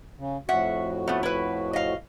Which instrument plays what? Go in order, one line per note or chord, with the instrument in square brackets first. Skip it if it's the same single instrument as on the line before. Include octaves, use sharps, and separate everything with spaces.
[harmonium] C#3
[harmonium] F2 A2 F#4 [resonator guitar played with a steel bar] E5 F#5
[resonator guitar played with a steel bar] A3 B3
E4 B4
D#5 F5